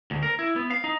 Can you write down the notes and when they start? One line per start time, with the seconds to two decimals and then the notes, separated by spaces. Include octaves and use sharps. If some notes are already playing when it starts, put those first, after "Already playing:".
0.11 D2
0.23 A#4
0.39 E4
0.56 B3
0.70 F5
0.84 D#4